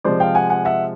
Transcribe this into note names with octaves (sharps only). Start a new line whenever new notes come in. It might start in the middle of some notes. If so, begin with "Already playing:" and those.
C3 F3 G#3 C5 D5
F5 G5
F#5 G#5
F#5 G#5
E5 F#5